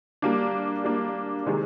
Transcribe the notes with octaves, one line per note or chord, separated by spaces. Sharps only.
G3 A#3 D4
G3 A#3 D4
C3 D#3 G#3